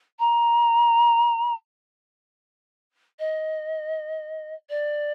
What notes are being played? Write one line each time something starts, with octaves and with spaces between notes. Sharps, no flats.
A#5
D#5
D5